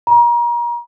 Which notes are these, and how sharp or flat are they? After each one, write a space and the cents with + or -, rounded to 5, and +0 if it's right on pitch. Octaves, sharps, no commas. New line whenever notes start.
A#5 +35